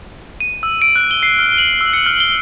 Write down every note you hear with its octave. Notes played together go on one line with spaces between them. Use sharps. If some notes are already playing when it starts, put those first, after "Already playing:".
D#7
E6
D7
F#6
G7
C7
F6
F#7
E6
C#7
F6
G7